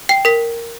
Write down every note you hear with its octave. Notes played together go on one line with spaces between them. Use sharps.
G5 C7
A#4 B6